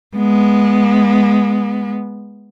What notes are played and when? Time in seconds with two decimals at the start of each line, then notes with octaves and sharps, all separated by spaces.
0.16 G#3 B3